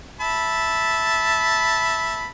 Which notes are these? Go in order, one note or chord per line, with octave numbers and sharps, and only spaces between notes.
E5 A5 B5